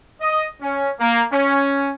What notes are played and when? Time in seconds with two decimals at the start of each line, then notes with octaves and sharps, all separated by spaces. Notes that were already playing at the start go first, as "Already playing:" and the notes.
0.21 D#5
0.62 C#4
1.00 A#3
1.32 C#4